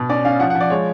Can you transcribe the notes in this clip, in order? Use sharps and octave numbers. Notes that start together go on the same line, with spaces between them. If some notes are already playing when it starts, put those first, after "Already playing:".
Already playing: B2
C#4 D5
C#4 F5
F3 F#5
F#5
F3
D5
G#3 C#5